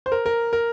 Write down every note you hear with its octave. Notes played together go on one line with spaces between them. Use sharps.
C5
A#4
A#4
A#4